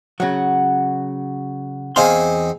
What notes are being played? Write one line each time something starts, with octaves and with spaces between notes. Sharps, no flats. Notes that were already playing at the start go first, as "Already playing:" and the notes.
C#3 F#3 F#4 F#5
E2 C4 D#4 G#4 F5 C6